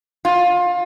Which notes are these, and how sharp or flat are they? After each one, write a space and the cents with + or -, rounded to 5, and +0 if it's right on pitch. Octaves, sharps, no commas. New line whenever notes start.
F4 +25